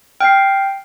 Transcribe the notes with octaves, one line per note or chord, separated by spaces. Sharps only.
G5 F6 C7